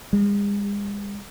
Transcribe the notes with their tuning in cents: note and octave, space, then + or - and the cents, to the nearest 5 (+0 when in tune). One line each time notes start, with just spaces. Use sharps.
G#3 -40